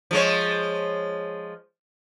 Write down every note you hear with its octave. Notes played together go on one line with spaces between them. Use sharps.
F3 G#3 C#5